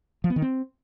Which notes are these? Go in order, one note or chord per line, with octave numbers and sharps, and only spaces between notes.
F3
B3
D#3
C4